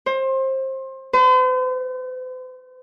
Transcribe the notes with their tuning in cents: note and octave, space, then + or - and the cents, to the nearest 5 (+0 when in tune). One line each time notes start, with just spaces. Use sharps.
C5 +25
C5 -45